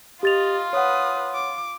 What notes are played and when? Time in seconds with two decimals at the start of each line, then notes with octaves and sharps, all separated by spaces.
0.23 F4 G4 D#5 A6 F7
0.73 B4 C#5 F#5 D#6
1.35 D6